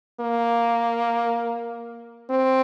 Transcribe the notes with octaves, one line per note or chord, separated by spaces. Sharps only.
A#3
C4